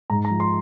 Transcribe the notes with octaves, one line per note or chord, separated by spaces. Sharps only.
G#2 A#5
A#5
F3
C6